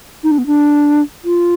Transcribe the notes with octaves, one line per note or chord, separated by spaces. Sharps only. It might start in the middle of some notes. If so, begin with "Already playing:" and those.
D#4
D4
B3
D4
F4